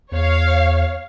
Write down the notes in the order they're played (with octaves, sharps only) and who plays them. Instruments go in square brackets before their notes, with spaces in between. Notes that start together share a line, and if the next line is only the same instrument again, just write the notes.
[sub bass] E2 [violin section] C#5 F5